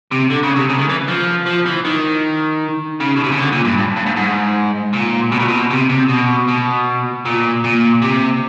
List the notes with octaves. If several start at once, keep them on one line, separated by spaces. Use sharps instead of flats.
C3
D3
C#3
C3
C#3
D#3
E3
F3
F3
E3
D#3
C#3
B2
C3
C#3
D3
A#2
G2
G2
G2
G#2
G#2
A#2
B2
A#2
B2
C3
C3
B2
B2
A#2
A#2
C3